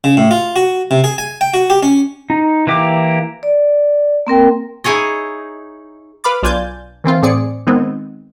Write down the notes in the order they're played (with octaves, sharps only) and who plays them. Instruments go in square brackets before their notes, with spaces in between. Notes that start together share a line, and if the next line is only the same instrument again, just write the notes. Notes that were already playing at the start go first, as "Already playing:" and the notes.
[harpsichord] C#3
A2
F4
F#4
C3
G#4
G#5
G5
F#4
G4
C#4
[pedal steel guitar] D#4
E3 A#3 G4 D6
[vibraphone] D5
A#3 C4 A#4 G5
[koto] D#4 E4 G#4 C#5 D#5
[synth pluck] B4 F5 B5 D6 A6
B1 D4 F4 G#5 G6 A6
D#3 E3 C4 F4
A2 C4 G#4 D5 C#7
D#3 G#3 B3 C4